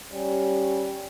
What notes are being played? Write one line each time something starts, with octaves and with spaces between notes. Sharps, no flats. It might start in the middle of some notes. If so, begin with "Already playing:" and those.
G3 C#4